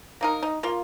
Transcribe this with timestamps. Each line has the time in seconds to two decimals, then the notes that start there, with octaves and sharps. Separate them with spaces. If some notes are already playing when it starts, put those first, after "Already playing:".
0.21 A#3 D#4 A#4
0.43 D#4
0.63 A#3 F4